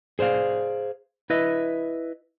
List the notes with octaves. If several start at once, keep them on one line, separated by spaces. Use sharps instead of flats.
G#4 C5 D5 F5
E4 B4 D#5 E5